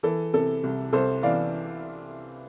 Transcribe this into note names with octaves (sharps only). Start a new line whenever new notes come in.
E3 A4
C3 A4
C2
C2 A4 C5
E3 D5 F5